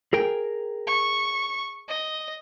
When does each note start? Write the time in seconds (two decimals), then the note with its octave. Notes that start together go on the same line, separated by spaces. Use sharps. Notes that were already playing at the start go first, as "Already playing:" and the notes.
0.13 G#4 A#4 G5
0.87 C#6
1.88 D#5